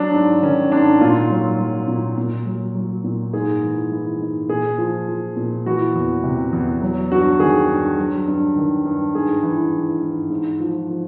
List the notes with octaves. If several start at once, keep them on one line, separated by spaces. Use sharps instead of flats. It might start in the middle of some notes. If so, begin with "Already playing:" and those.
Already playing: F#3 D4
G#2
D#3 C#4
G#2 D4
A#2 F4
F#3
F#3
A#2
A#2
F#3
F#3
A#2
G#2 G#4
E3
E3
G#2
A#2 G#4
F3
F3
A#2
E3 F#4
E2
C3
E2
F#3
G2 F#4
D#3 G#4
G2
F#3
G2
D#3
G2
G#2 G#4
E3
E3
G#2
G#2
F3
F3